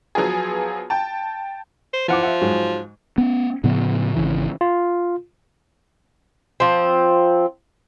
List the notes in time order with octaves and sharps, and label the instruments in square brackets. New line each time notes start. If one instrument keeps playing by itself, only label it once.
[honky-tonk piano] F3 F#3 B3 F4 G#4
G5 A5
[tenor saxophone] C5
[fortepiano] E3 F#5 D6 [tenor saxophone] F3
[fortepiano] E5 F#5
G#2 F#3 G#3
[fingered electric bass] B3 C#4
A2 C#3 F3 B3
G#1 D2 C#3 E3
[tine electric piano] F4
[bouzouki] F3 C4